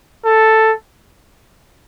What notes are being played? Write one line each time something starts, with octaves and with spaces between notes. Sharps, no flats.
A4